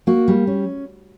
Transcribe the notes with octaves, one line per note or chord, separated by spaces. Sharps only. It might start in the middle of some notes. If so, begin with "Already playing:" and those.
A#3 F#4
G3
C#4